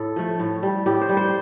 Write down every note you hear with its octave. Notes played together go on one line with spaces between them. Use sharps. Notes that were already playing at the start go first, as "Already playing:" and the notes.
Already playing: A2 A4
F3 A3
A2
G3
A2 G4
C5
G3
C5